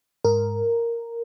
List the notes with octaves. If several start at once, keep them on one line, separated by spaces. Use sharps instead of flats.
G#2 A#4